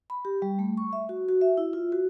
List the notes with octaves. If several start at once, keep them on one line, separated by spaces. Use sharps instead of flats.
B5
G4
G3
A3
C#6
E5
F#4
F#4
E5
E4
F4
F#4